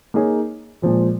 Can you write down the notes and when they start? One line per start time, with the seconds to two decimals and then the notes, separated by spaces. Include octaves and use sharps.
0.14 A#3 D#4 G#4 C#5
0.82 A#2 F3 G#3